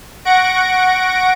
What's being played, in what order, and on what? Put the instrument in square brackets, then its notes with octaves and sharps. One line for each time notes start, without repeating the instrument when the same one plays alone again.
[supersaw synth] F#5 C#6 A#6 D7